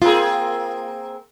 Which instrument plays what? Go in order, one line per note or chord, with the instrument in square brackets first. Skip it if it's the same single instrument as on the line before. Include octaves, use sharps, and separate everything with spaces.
[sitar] A#3 C4 G#4 [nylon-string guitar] F4